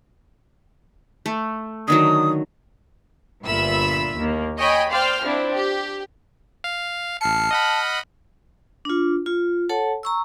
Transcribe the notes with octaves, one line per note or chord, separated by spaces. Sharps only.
A3
D3 D#3 F#3 D#6
G1 A#2 F4 E5 B5 E6
D#2 A#3
C#5 D#5 G5 G#5 B5
C5 D5 F5 G5 F6
F3 C4 D4 E4
G4
F5
A1 A5 F6 C7 C#7
D#5 F#5 B5
D4 F4
F4
A4 C#5 F#5 A5
A#5 C#6 E6